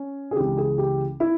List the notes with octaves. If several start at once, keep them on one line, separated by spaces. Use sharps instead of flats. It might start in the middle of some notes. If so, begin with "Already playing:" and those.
Already playing: C#4
G#4
C#2 C#3 E3 G4
G#4
G4
E4